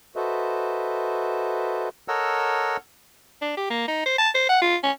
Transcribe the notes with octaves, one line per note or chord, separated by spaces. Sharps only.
F#4 A4 B4 C5 D#5 E5
A4 A#4 C#5 D#5 F#5 E6
D4
G4
A#3
D#4
C5
A5
C5
F#5
F4
C#4